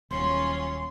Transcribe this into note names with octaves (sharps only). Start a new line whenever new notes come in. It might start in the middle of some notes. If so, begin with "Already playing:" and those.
D#1 F#3 C#4 F4 C6